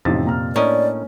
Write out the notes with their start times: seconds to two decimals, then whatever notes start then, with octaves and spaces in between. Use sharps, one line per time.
0.05 A1 F2 C3 D#4 A6
0.25 A#2 A#5 F6
0.56 A2 A#3 C#4 D4 A#4 D5 D#5